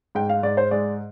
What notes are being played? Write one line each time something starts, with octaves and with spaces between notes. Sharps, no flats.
G#2 G5
F5
G#2 D5
C5
G#3 D5